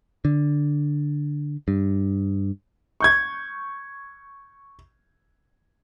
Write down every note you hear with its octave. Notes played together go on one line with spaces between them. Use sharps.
D3
G2
C#6 G6 G#6